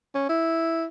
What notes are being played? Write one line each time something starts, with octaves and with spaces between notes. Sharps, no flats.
C#4
E4